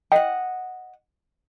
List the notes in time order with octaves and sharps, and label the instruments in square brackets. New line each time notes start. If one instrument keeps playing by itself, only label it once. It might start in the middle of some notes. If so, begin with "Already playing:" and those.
[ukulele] D#5 F#5 [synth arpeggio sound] G5